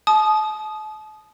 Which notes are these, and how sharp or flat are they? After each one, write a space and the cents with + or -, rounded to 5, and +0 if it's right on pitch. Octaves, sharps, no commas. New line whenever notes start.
A5 -40 D#6 -10